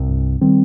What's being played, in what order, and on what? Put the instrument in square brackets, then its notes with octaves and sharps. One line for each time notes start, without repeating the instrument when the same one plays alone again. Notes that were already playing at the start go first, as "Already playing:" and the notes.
Already playing: [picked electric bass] C2 C3
[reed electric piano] G2
D#3 G3 C4